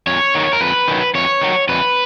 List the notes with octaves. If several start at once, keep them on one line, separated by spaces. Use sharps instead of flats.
F2 C#5
D#3 F#3
A#4
F2 B4
D#3 F#3
F2 C#5
D#3 F#3
F2 B4